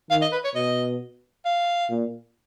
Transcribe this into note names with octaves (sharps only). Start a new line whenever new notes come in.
D#3 F5
D#5
B4
C#5
B2 D#5
F5
A#2